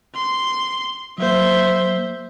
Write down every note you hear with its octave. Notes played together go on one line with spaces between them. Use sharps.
C6
F#3 A#3 C5 E5